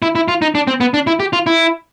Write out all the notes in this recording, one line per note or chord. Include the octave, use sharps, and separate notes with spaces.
E4
E4
F4
D#4
D4
C4
B3
D4
E4
G4
F4
E4